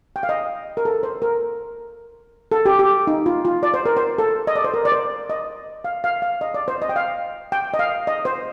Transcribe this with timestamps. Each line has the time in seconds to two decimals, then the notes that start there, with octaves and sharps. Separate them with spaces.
0.16 G5
0.23 F5
0.29 D#5
0.77 A#4
0.85 A4
1.03 C5
1.22 A#4
2.52 A4
2.66 G4
2.79 G4
3.07 D#4
3.26 F4
3.45 F4
3.63 D5
3.74 C5
3.86 A#4
3.97 C5
4.18 A4
4.47 D#5
4.55 D5
4.64 C5
4.74 A#4
4.85 D5
4.92 C5
5.30 D#5
5.84 F5
6.04 F5
6.22 F5
6.41 D#5
6.54 D5
6.68 C5
6.82 D#5
6.89 G5
6.96 F5
7.52 G5
7.74 D#5
7.79 F5
8.07 D#5
8.25 C5